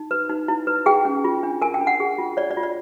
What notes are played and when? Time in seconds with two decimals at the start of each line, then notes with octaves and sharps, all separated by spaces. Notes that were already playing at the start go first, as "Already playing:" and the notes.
Already playing: D#4
0.11 B4
0.30 D#4
0.48 E4
0.67 B4
0.86 G#4 G5
1.05 C#4
1.24 F4
1.43 D4
1.62 A#4 G#5
1.74 G5
1.81 D4
1.87 F#5
2.00 G#4
2.18 F4
2.37 C#5 D5
2.51 D5
2.57 F4
2.63 D5